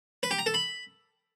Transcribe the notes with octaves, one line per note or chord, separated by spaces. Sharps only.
B4
G4
A#5
A4
B5